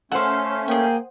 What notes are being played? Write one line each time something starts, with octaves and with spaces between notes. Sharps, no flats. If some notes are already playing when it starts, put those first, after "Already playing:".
A3 C#4 A4 C5 F5 F#5
A#3 G#4 G5